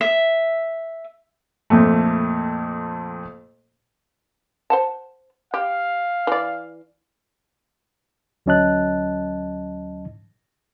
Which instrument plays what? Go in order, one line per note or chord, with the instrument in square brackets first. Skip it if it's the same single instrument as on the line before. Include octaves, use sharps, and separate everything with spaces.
[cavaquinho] E5
[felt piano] F2 A#2 A3
[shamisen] C5 F#5 A5
[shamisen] G4 [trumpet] F5
[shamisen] E3 D5
[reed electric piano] D2 F#3 C#4 D#5 A5 F#6